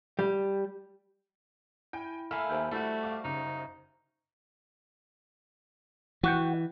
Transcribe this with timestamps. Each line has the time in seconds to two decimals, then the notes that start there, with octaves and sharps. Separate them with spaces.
0.19 G3
1.93 E4 G5 G#5 G6
2.31 A3 A#3 F5 G#5 B5 E6 F6 E7
2.49 D#2 C5 E5 G6
2.71 G3 A3 E4 F#4
3.03 F5 D6
3.24 F#1 C#3 D#4
6.23 E3 F#4 F#5 G5